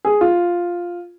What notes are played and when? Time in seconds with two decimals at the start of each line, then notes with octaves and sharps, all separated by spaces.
0.05 G#4
0.21 F4